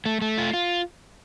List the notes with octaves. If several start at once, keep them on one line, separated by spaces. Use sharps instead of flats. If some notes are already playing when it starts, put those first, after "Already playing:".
A3
A3
F4
F4